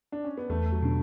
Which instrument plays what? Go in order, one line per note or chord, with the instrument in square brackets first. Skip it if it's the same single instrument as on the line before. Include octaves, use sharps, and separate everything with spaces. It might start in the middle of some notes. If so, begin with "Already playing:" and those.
[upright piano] D4
C#4
B3
[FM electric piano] E2 [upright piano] A3
[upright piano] F#3
[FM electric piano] B2 [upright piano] D3